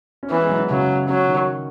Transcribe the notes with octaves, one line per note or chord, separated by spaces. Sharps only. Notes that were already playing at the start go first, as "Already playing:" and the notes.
C#4
E3 B3
G#3
F#3
E3
C#3 F#3
F#3 C#4
D#3